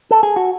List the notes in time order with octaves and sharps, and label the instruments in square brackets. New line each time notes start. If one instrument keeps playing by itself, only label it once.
[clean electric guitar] A4
G#4
F#4